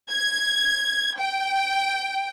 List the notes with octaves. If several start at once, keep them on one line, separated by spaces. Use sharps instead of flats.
G#6
G5